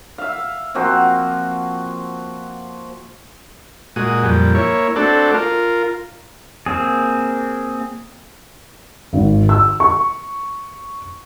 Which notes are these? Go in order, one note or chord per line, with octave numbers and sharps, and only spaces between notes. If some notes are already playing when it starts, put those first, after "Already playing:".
E5 F5
F3 A#3 C4 F#4
A#2 G#3 F#4 D#6
F2 A#2 G3
A#3 E4 C#5
A3 C4 D4 F#4 A4 D5
F4 A#4
A#3 C4 G#4
G#1
E6
C#6